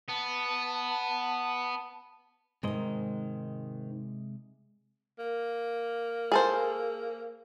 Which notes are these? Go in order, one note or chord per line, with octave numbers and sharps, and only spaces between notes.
B3 A5
G#2 C3 D#3 G#3 D#5
A#3
G#4 A4 C5